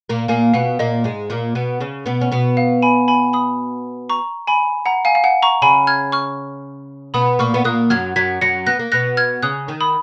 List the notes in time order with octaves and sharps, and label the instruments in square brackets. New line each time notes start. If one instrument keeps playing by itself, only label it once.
[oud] A#2 A#3
[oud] A#2 A#3 [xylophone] F5 G#5
[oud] B2 B3 [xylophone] F5
[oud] A#2 A#3 [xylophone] D#5
[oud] G#2 G#3
A#2 A#3
B2 B3
C#3 C#4
B2 B3
C#4
B2 B3
[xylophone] F5
G#5 B5
G#5 B5
B5 D#6
A#5 C#6
G#5 B5
F#5 A#5
F5 G#5
F5
F#5
A#5 C#6
[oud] C#3 C#4 [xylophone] G#5 B5
[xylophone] F6 G#6
C#6 F6
[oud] B2 B3 [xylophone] B5 D#6
[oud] A#2 A#3 [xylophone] C#6 F6
[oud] B3
[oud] A#2 A#3 [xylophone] D#6 F#6
[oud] F#2 F#3 [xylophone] F6 G#6
[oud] F#2 F#3 [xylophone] G#6 B6
[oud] F#2 F#3 [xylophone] A#6 C#7
[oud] B3 [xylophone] F#6 A#6
[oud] A#3
[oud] B2 B3 [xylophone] F#6 A#6
[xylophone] F6 G#6
[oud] C#3 C#4 [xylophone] D#6 F#6
[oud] D#3 D#4
[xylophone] B5 D#6